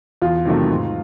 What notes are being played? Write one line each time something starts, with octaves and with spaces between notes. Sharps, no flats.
E2 F4
C3 D#3 F#3 A3
G#2